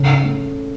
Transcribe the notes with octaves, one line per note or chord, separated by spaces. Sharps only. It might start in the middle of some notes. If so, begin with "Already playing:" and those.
Already playing: C#3 A4 C#5
A3